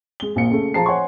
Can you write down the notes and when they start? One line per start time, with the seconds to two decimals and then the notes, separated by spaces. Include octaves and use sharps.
0.20 G#3 G7
0.36 A#1 A#2 C#7
0.51 C#3 A3
0.74 F3 G#4 C5 A5 A#5 C7
0.86 C5 C#5 F#5 G#5 C6 C#6